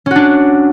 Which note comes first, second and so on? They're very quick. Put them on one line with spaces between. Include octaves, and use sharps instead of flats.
C#4 F#4 D4